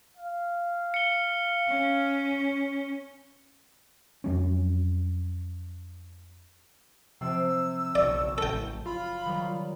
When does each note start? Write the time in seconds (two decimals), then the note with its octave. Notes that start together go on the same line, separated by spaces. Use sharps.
0.17 F5
0.94 C#7 G7
1.67 C#4
4.24 F2 F#3 C#4
7.21 C3 F3 C4 E6 D7
7.95 F#1 B1 D5 C#6
8.38 A1 A4 G5
8.86 F4 B5
9.26 D#3 F#3 G3